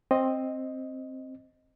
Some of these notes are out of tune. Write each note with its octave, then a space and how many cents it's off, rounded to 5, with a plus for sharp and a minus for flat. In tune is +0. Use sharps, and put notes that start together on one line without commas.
C4 +10 D#5 +0